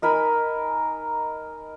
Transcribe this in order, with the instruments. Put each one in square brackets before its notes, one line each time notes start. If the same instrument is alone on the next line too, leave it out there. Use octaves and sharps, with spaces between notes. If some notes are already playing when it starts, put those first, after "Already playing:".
[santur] D#4 A#4 G#5 B5